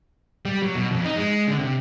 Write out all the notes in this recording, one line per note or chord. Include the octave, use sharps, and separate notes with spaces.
G3
F#3
B2
F2
D#4
G#3
D3
C3